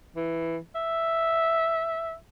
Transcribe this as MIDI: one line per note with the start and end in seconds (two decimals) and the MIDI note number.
0.16 0.58 52
0.75 2.14 76